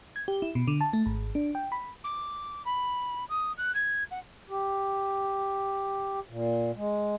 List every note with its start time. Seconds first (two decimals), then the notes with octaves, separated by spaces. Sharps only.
0.16 G#6
0.28 G4
0.42 E4
0.55 B2
0.68 D3
0.81 A5
0.93 A3
1.06 G#1
1.35 D4
1.55 G5
1.72 B5
2.04 D6
2.65 B5
3.29 D#6
3.57 F#6
3.74 G#6
4.11 F#5
4.50 G4
6.29 A#2
6.76 G#3